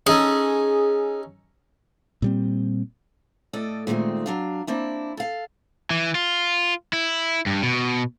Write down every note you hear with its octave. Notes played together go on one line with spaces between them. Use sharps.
C#4 D#4 G#4 A4
A#2 G3 C4
A2 A4 D5 D#5
A#2 D#3 G#3 A3 C4
F#3 D4 F5
A#3 C4 D4 E4
A4 F5
E3
F4
E4
G2
B2